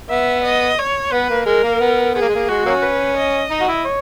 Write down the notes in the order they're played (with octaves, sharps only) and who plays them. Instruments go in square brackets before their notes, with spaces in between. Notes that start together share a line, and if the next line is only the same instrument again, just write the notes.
[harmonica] B3 [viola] E5
[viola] D#5
C#5
[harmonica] B3 [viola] B4
[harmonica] A#3
[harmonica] G#3 [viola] A#4
[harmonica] A#3
B3
[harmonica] B3 [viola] G#4
[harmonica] A#3
G#3
A#3
[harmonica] G#3 [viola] F#4
[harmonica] F#3 A#3 C#4
[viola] B4
D#5
[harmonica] D#4
F#4
E4
C#5